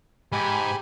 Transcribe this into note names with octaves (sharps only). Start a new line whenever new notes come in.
G#2 G4 G#5 B5